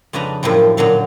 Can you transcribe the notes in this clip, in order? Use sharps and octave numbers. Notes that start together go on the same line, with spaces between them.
F2 C#3 D4 B4 D#5 A#5
F#2 A2 F3 G3
F#2 A#2 D3 F#3 F5